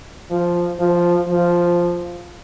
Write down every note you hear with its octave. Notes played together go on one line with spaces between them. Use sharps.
F3
F3
F3